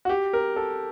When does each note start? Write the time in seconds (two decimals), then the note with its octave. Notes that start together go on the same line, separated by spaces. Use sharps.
0.05 F#4
0.09 G4
0.33 A#4
0.56 A4